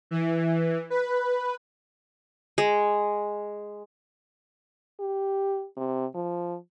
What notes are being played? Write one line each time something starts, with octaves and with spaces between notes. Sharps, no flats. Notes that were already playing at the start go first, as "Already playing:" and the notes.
E3
B4
G#3
G4
C3
F3